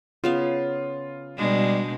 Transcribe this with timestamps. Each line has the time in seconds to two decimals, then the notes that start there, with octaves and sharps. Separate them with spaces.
0.24 C#3 B3 F4 F5
1.37 B2 G3 G#3 D4